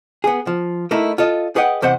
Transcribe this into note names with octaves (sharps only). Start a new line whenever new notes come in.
B3 G#4
F3
A3 A#3 D#4 E4
F4 A4 D#5
G#4 B4 D#5 F#5 G5
E2 C3 C5 D#5 F#5